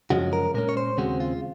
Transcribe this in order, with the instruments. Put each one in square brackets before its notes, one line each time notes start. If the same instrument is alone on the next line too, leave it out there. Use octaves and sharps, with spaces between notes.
[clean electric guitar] F#2 C#3 F3 G#3 C#4 F#4
A#4
A#2 G#3 C#4 A#4
C#5
C5
D#2 C#3 G#3 C4 F#4
F4